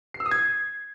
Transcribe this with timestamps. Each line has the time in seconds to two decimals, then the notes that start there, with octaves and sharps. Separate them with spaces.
0.14 C7
0.20 E6
0.26 D#6
0.31 G#6